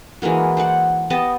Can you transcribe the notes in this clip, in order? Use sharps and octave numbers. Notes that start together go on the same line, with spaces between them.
E3 G#3 A#3 F#4
C5 D5 F#5
B3 G4 D#5 A5